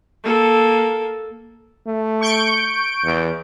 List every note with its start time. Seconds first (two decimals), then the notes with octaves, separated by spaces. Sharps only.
0.24 A#3 A4
1.87 A3
2.21 C#6 G6 D7
3.04 E2